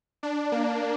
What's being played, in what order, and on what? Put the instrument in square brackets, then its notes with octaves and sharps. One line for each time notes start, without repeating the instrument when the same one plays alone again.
[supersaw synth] D4
A#3